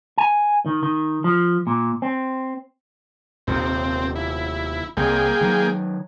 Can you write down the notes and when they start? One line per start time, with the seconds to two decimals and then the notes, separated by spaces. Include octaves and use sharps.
0.18 G#5
0.66 D#3
0.83 D#3
1.24 F3
1.67 A#2
2.02 C4
3.47 D#1 D#2 C3 C4
4.16 E4
4.97 C2 A#3 G#4 G5
5.41 D#3 F#3